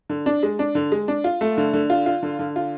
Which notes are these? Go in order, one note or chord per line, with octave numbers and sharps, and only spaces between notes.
D3
D4
G#3
D4
D3
G#3
D4
F4
A3
D3
D3
F4
F4
D3
D3
F4